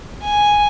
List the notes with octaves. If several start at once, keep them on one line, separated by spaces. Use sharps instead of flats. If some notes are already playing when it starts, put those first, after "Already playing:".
G#5